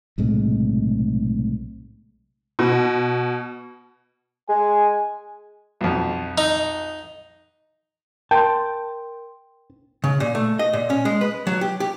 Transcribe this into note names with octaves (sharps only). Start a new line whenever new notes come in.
B1 A2 C3 G#3
B2
G#3 G#5
B1 F2
D#4
A#4 G5 A5 C6
C#3
A#2
A3
D#5
A#2
C#4
G#3
B4
F#3
G4
G4